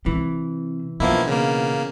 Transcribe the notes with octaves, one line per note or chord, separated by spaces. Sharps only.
C3 E3
B2 F3 A#3 D4 E4
C#3 A#3